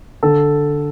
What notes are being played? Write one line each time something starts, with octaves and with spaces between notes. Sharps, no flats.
D3 A4